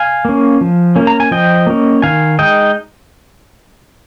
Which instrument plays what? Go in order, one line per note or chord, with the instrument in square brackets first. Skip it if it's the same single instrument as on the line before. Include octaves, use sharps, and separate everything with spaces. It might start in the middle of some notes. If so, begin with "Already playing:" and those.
Already playing: [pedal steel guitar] F5 G#5
A#3 C#4
F3
A#3 C#4
A#5
G#5
F3 D#5 G5
A#3 C#4
D#3 F5 G#5
G#3 D#4 D#5 G5